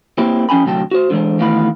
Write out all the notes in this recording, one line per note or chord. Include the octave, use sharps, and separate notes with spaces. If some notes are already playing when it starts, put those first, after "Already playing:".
A#3 C4 E4 G4
F3 C#4 G5 G#5 B5
D2 C3 F#3 G5 A5
F#4 C5
D3 E3 F3 G#3 C5
D#3 E3 A3 B3 F5 B5